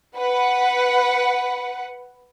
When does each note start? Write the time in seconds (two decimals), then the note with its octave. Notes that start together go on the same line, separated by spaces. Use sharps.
0.15 B4 F#5